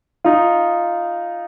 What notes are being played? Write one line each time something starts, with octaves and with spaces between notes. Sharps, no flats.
D#4 F4